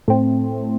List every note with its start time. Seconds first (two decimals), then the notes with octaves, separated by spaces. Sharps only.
0.08 A2 A3 C4